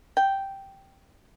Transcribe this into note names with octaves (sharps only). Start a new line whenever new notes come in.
G5